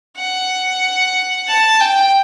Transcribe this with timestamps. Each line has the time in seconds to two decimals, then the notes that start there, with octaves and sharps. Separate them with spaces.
0.17 F#5
1.48 A5
1.81 G5